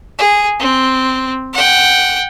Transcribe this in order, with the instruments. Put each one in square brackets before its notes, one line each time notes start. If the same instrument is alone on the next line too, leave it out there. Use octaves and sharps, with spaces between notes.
[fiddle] G#4
C4
F#5 G5